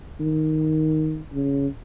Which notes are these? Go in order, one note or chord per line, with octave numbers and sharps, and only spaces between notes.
D#3
C#3